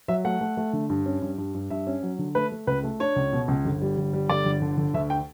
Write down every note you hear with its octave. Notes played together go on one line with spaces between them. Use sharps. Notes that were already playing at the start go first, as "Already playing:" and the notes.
F#3 E5
A3 F#5
A3
A3
D3
G2
C#4
G2
G2
G2
G2 E5
C#4
F#3
D3
A3 B4
A3
C#2 B4
A3
D4 C#5
C#2
B2
C#2
G1
G3
G1
G3
G1 D5
G1
D3
D3
D2 E5
G5